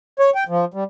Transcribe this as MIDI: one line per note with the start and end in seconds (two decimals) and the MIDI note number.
0.19 0.30 73
0.35 0.44 79
0.49 0.65 53
0.74 0.84 55